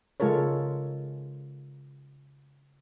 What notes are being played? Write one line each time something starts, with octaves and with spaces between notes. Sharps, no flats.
C#3 G#3 F4 A4 A#4 C#5